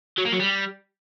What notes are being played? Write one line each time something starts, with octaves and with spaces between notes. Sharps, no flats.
F#3
A#3
F#3
G3